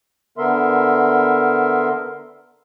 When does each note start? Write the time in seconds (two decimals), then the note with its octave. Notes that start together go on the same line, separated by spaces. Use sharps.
0.38 D3 B3 A#4 E5 C6